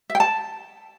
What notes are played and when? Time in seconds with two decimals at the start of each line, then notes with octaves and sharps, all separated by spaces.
0.10 E5
0.15 G5
0.20 A5